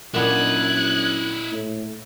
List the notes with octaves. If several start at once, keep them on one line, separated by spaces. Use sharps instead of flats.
F#2 A#2 B3 D4 E4 D#5 F#6 G#6
A2